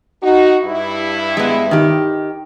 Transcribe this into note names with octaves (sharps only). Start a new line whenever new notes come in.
D#4 F#4
G2 E4
G#3 B3
D#3 G4